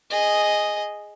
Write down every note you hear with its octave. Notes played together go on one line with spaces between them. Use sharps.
G#4 D#5